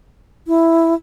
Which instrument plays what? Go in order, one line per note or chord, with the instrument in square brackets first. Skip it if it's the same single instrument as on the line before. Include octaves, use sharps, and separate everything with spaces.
[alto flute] E4